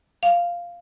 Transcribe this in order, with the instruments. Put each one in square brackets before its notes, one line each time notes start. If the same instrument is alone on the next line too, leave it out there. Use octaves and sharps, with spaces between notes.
[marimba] F5